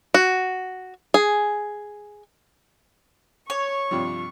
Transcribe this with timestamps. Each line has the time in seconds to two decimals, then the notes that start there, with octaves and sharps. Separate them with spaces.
0.14 F#4
1.14 G#4
3.50 C#5 C#6
3.91 G2 C3 F3